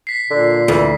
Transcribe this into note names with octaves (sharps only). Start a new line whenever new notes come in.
B6 C7
A#2 D3
D2 E3